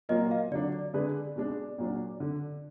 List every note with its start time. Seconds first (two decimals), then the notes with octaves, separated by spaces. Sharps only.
0.09 A#2 F#3 A#3 F4 A#4 D#5
0.31 F5
0.51 D3 F#3 D4 D5
0.72 D5
0.94 D3 G#3 D4 G#4 B4
1.36 B2 G#3 D4
1.79 A#2 F#3 D4
2.20 D3